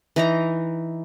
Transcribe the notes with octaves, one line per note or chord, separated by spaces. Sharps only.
E3 D#4 A#5